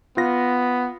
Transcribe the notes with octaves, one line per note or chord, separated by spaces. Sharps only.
B3 F4 A#6